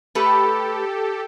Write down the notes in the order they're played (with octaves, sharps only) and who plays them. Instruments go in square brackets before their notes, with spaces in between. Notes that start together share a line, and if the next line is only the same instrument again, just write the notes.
[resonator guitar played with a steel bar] A3 B4 [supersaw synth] G4 A4